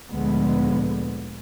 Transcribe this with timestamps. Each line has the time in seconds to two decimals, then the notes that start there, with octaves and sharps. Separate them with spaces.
0.11 D2 A#2 D3 F3 G#3 B3